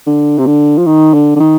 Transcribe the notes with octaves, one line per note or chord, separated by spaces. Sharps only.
D3
C3
D3
F3
D#3
D3
D3
D#3